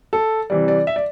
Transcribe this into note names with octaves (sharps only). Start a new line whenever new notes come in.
A4
C3 E3 G3 D5
D5
E5
D5